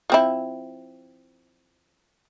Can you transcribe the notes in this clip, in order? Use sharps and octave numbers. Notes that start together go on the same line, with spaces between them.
F3 C4 E4